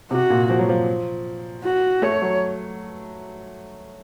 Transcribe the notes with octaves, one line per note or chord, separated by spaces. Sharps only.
C3 F#4
A#2
F3
F#3
F3
F#4
A3 C#5
F#3